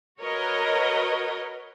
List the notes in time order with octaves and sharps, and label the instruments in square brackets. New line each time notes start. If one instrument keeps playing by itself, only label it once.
[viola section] F#4 A#4 B4 C#5 D#5